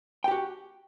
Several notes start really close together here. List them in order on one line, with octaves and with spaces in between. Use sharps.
G5 G4 F#4